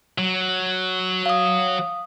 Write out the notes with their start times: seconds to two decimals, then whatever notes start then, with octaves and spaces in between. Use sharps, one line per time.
0.18 F#3
1.26 F5 D#6